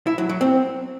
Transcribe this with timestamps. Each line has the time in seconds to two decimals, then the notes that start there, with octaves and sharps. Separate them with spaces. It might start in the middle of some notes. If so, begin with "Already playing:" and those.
0.07 E4
0.18 F#3
0.29 F#3
0.41 C4